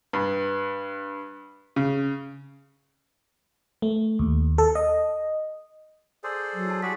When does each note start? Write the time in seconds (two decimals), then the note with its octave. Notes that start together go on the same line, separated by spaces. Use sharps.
0.13 G2
1.76 C#3
3.82 A3
4.19 D#2
4.58 A4
4.75 D#5
6.24 G#4 A4 C5 D5
6.54 F#3
6.66 E4 A5
6.82 G3 F#4 G#4 D5 B6